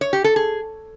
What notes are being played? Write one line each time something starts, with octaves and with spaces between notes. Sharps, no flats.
C#5
G4
A4
G#4